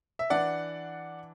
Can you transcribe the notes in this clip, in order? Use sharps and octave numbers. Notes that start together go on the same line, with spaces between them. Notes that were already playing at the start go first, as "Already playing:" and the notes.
E5
E3 D4 D5 F#5